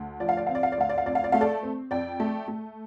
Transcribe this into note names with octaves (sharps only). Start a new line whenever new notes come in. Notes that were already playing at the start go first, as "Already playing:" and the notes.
Already playing: D2
F3 D5
F5
D5
C4 F5
D5
F5
D5
D2 F5
D5
F5
F2 D5
F5
D5
A3 F5
A4 D5
C4
F2 D5 G5
A3
A3